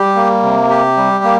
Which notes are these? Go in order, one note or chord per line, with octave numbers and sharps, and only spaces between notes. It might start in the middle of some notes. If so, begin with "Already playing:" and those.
Already playing: G3 G4
A#3
C3
G4
G3
A#3